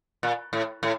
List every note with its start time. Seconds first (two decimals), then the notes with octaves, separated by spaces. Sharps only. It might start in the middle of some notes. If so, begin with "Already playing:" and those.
0.23 A#2
0.53 A2
0.83 A2